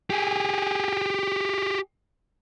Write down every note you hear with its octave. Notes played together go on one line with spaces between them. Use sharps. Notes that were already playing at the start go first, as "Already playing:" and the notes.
G4 G#4